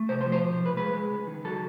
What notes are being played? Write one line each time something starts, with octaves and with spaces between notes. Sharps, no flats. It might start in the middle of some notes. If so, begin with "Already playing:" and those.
Already playing: A3
C3 C5
C5
F3
C5
B2
B1
B4
G#3 B4
G#3
C#2
D#3
F#3 A4